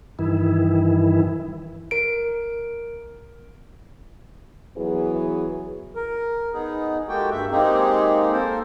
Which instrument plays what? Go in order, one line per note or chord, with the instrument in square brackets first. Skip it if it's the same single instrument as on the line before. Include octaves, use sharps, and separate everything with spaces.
[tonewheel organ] G2 D#3 E3 E4
[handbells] A#4 D7
[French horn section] E3 F#3 B3 G#4
[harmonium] A#4
B3 D#4 G#4
G#3 A#3 F#4 G4 A4 G5
G2 E5
G#3 A#3 C4 D#4 G4 G#4
A#3 A4 A#4 C5